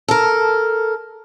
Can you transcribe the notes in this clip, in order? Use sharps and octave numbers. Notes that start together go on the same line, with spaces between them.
A4 A#4